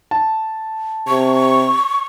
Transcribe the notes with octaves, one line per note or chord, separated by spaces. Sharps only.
A5
C3 C#6